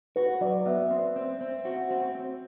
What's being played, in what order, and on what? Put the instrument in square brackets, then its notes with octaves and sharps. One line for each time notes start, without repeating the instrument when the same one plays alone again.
[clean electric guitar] F#4 [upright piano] B4
[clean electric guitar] F#3 [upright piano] D5
[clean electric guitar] B3 [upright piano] E5
[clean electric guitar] C4
C4
C4
F#4
C4
C4